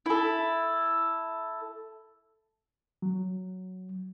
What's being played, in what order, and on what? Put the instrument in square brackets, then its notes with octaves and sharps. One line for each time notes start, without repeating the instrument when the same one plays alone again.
[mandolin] E4 A4
[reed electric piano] F#3